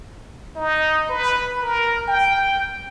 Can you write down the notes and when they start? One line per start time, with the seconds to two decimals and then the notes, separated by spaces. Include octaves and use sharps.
0.56 D#4
1.09 B4
1.63 A#4
2.07 G5